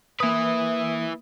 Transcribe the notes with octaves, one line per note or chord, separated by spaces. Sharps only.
A#3 E4 B4 D#6